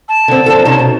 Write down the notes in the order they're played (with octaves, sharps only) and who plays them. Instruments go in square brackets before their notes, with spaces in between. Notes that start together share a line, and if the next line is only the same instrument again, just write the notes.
[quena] A5
[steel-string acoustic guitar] D3 C4
F3 D4 A4
C3 C#4 D#4
B2